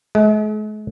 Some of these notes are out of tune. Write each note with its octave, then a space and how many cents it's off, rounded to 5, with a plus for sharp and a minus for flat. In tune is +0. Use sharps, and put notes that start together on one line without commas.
G#3 +45